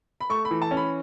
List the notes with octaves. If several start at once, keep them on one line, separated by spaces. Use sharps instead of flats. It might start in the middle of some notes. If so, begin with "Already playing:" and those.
B5
A3 C#6
B5
E3
A5
C#4
B5